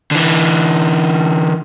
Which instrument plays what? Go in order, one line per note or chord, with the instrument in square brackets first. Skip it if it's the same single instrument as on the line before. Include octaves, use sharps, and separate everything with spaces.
[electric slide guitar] D3 E3